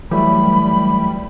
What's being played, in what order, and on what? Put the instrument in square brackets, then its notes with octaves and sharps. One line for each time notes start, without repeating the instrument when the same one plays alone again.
[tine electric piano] E3 F#3 A3 [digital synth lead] G3 [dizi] B5